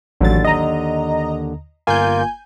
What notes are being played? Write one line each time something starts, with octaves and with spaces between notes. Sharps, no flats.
A1 D#2 D3 F#3 A6
D#5 A#5
G1 A#3 F4 G#5 G6